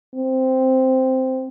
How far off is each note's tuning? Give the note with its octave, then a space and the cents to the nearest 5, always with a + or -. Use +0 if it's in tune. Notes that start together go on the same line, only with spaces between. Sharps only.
C4 -5